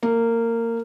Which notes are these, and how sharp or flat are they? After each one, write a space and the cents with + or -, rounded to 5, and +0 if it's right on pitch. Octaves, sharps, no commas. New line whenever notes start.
A#3 -20